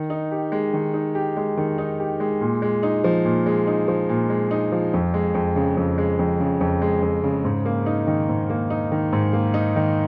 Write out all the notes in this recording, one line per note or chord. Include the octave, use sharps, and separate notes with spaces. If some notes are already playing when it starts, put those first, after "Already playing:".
Already playing: D#3
D#4
G4
G#3
D#3
D#4
G4
G#3
D#3
D#4
G4
G#3
A#2
G#3
D#4
F3
A#2
G#3
D#4
F3
A#2
G#3
D#4
F3
F2
G#3
F2
C#3
F2
G#3
F2
C#3
F2
G#3
F2
C#3
G#2
A#3
D#4
D#3
G#2
A#3
D#4
D#3
G#2
A#3
D#4
D#3